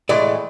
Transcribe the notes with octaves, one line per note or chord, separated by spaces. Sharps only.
A2 E3 G#3 D5